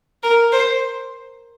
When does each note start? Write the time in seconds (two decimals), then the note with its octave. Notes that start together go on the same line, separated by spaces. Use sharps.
0.23 A#4
0.52 C5